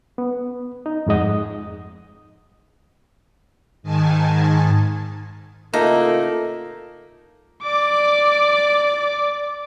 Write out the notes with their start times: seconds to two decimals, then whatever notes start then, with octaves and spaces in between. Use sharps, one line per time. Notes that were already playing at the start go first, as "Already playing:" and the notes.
0.18 B3
0.86 D#4
1.07 F2 G#2 G#3 D#5 F#5
3.83 G#2 D#3 G#5 A5
5.73 A2 C#3 A3 A#3 D#4 F4 A4
7.63 D5 D6